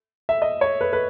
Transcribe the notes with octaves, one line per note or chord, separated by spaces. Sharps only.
E5
D#5
C#5
B4
B4